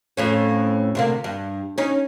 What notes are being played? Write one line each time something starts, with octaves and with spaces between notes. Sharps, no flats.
F2 A2 C#4
D2 C3 A#3
G2
C#4 D#4